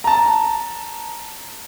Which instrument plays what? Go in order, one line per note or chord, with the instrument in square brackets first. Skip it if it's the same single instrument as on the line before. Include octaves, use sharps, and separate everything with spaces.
[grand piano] A5 A#5